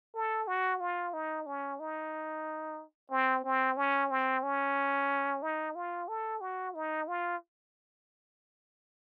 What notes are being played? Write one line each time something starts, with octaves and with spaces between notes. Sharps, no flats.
A4
F#4
F4
D#4
C#4
D#4
C4
C4
C#4
C4
C#4
D#4
F4
A4
F#4
D#4
F4